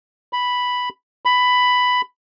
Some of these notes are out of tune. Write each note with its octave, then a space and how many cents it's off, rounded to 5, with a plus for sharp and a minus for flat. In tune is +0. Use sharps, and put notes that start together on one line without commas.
B5 +0
B5 +10